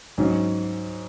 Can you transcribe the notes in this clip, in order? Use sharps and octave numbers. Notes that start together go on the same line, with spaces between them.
G#2 F#3 C#4